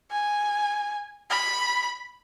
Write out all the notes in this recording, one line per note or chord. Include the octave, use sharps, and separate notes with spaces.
G#5
B5